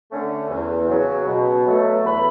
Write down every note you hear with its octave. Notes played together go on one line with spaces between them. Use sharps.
D3 A3 C#4
E2
C#3 F#3
B2
F#3 A3
E2 B5